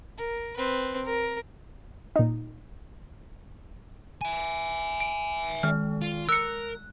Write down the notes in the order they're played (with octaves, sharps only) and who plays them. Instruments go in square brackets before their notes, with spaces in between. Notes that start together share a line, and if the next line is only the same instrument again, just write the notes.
[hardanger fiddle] A#4
C4 B4
A#4
[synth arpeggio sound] A#2 D#4
[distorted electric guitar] E5 G#5
[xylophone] D7
[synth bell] D#3 G#3 [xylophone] F6
[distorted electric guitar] F4
[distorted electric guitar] A#4 [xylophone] E6 C#7 [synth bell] F#6